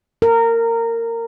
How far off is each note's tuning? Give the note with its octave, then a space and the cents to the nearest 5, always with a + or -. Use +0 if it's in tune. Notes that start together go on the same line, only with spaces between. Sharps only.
A#4 -20